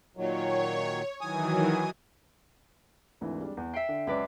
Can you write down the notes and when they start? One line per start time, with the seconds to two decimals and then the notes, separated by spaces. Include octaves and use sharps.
0.17 A#2 D#3 F#3 C#5
1.21 D#3 E3 F#3 G#5 D#6
3.21 G#1 D2 E3
3.41 G3 G#3 D4
3.57 E2
3.74 E5 G5 C7 D7
3.89 D3
4.07 C#2 F#2 B4 D5